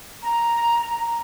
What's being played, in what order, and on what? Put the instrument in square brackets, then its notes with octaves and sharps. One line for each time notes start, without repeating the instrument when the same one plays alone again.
[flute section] A#5